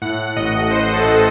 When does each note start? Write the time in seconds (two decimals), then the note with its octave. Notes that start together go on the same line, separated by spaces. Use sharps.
0.02 A2 F#5
0.36 A1 D#5
0.71 A2 C5
0.94 A4
1.05 A2